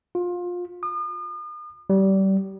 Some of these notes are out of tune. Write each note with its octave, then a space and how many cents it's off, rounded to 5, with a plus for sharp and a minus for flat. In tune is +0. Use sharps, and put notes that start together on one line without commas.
F4 +25
D#6 -40
G3 -25